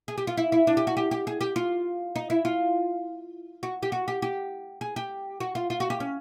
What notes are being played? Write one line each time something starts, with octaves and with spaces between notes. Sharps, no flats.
G#4
G4
F4
E4
E4
D4
G4
F#4
G4
G4
G#4
G4
F4
D#4
E4
F4
F#4
G4
F#4
G4
G4
G#4
G4
F#4
F4
F4
F#4
G4
C#4